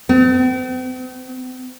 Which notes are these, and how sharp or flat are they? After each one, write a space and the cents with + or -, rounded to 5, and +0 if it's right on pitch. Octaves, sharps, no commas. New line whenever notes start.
C4 -45